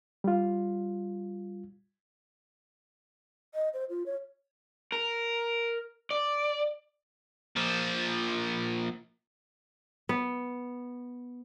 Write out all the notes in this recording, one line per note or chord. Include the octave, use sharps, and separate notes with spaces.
G3 F4
D#5
C5
F4
C#5
A#4
D5
A#2 F3
B3